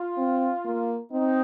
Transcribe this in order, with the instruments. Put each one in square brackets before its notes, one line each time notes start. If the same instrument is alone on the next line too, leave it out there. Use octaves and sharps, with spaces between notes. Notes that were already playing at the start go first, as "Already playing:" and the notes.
Already playing: [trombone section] F4
[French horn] C4
A#3
[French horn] C4 [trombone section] D#4